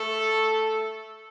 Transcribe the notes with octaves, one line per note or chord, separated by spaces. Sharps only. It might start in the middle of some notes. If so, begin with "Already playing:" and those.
Already playing: A3 A4